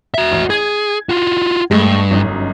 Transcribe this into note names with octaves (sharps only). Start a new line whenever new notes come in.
F#4 E5
A1
G#4 G#6
F4 F#4
G2 G#3 A3
G1 F#2 D#4